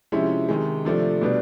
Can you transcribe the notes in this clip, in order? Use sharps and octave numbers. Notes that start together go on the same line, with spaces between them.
C3 F3 G#3 C#4 E4
C3 D#3 G#3
C3 F3 A3 D4
B2 G3 B3 D4